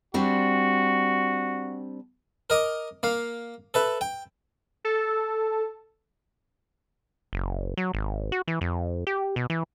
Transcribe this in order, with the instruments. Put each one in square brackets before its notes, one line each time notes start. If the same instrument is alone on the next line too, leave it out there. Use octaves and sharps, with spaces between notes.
[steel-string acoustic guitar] G3 C4 D4 [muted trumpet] F#4
[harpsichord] A#4 D#5 D6
A#3 F5
A4 B4 E5
G5
[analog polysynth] A4
[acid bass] F#1
F#3
G#1
F#4
E3
F2
G4
B2
E3